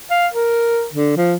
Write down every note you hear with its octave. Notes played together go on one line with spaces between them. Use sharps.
F5
A#4
D3
F3